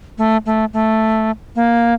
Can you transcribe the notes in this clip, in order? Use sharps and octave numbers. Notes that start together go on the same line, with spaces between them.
A3
A3
A3
A#3